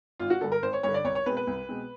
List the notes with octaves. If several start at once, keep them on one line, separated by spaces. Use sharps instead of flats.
G#1 F4
F#4
G2 D3 A4
A#4
G#1 C5
C#5
G2 D3 C#5
D5
C2 C#5
C#5
B2 G#3 C4 B4
B4
C2
B2 G#3 C4